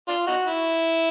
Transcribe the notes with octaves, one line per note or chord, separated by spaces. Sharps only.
D4 F4
D#4 F#4
E4